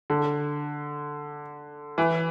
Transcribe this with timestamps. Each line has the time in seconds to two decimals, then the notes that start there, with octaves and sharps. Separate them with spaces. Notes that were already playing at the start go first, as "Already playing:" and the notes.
0.10 D3
1.98 E3